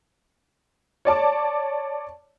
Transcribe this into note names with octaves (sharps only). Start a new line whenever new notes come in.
C#5 D5 A5 D6